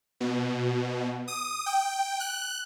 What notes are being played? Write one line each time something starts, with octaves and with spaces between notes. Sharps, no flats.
B2
D#6
G5
F#6